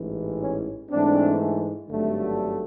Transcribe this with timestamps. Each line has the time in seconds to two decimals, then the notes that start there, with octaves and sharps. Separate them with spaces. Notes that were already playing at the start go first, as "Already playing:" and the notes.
Already playing: A1 G#2 E3
0.41 C#4
0.90 G#2 E3 A3 C4 D4
1.90 G#1 G2 D3 F#3 A3